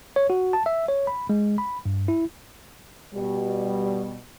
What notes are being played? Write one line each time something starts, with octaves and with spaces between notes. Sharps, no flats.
C#5
F#4
A5
E5
C#5
B5
G#3
B5
G2
E4
B2 G3